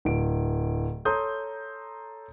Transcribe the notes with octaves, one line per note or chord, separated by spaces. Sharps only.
D1 D7
A4 C#5 A#5 C6 D#6 G6